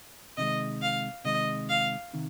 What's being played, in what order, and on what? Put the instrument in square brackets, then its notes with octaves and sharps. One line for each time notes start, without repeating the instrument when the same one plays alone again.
[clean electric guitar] C3 D#3 G#3 [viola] D#5
[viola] F5
[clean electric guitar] C3 D#3 G#3 [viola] D#5
[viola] F5
[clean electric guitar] C3 D#3